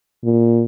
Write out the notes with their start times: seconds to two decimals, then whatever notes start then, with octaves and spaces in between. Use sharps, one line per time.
0.24 A#2